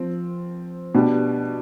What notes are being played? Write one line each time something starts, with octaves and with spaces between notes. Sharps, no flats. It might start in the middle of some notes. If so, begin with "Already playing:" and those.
Already playing: F3 C4
B2 B3 D4 G4